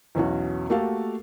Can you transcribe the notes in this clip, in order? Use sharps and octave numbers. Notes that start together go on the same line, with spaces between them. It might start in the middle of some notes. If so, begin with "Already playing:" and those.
B1 E2 C#4 F#4
A3 A#3 F#4 G4 A4 F5